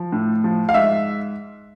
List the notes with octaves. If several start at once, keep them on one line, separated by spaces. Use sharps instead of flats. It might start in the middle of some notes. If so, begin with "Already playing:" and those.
Already playing: F3
A2
F3
F5
G#2 E5